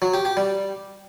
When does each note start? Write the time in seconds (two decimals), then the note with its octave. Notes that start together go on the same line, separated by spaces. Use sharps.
0.02 F#3
0.14 G4
0.25 G4
0.37 G3